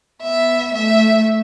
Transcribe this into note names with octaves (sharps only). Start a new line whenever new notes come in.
B3 E5
A3 E5